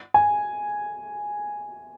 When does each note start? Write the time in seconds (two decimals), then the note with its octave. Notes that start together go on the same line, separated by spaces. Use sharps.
0.14 G#5